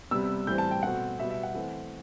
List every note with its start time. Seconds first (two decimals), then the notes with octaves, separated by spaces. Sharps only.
0.11 C3 G3 B3 E6
0.47 A2 E3 G3 C4 G6
0.58 A5
0.71 G5
0.83 B2 A3 C4 F#5
1.19 B2 G3 B3 E5
1.30 E5
1.43 F#5
1.55 E3 A3 C4